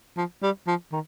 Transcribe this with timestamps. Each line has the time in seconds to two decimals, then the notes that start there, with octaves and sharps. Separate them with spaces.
0.17 F3
0.42 G3
0.67 F3
0.92 D#3